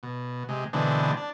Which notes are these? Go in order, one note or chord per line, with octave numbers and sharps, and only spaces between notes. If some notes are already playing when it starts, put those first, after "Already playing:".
B2
C3 G#3
B2 D3 E3 G#3 C4 D4
D4